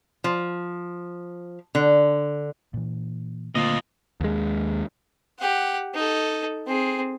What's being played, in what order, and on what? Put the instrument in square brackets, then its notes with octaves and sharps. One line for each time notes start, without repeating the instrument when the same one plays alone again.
[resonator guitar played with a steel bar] F3
D3
[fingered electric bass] A#2 E3
[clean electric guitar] D2 A#2 C4 [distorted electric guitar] F4 D#5
[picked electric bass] D#2 G#3
[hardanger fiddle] G4 F#5
D#4 A4
C4 G#4